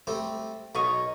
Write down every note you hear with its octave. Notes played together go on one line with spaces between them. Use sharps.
G3 A3 C4
B1 D#5 C#6 F6